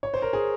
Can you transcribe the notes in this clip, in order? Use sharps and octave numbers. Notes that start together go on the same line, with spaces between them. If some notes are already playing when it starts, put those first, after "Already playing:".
C#5
C5
A#4
G#4